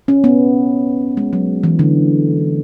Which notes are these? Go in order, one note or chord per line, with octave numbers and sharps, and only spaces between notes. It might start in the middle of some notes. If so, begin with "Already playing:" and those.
C#4
B3
G#3
F#3
E3
D3